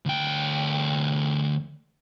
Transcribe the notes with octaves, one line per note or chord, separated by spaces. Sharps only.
D2 G5